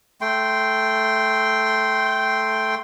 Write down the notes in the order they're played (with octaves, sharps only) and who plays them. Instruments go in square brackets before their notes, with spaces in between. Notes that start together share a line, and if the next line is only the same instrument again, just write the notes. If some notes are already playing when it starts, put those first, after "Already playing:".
[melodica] A3 G5 C6